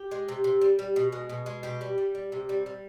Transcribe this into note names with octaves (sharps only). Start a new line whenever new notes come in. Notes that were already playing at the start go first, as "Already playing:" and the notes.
Already playing: G4
G#3
C3
C3
G3
G3
B2
G#3
B2
G#3
B2 G4
G3
G3
G3
C3
G3
G3